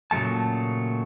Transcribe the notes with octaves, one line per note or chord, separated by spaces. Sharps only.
A#2 C#3 F#3 A3 A5